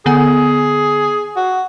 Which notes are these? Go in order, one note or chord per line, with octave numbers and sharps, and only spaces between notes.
D3 B3 G#4 G#5
F#4